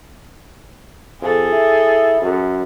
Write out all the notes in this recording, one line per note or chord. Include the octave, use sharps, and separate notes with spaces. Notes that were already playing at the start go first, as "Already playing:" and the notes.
F2 G#4 A4
E4
F#2